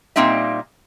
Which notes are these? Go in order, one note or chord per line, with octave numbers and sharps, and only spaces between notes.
A#2 G3 A#3 C4 D#4 E5